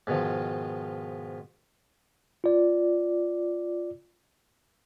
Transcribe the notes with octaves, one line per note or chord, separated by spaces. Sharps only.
G#2 B2 D#3 F3
F4 D5